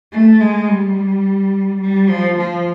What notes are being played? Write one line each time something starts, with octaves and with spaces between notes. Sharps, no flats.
A3
G#3
G3
G3
F3
F3